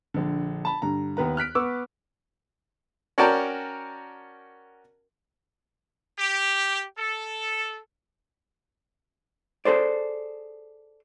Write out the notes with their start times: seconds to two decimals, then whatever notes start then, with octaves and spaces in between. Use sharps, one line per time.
0.14 A#1 D3
0.65 A5 B5
0.82 G2 D3 A#5
1.17 D#2 B3 B4 A#5
1.37 F6 F#6 B6 D7
1.55 B3 C#6 D6 E6
3.18 C#4 F#4 A#4 D5 G5 A5
6.19 G4
6.98 A4
9.65 G#4 A4 C5 D5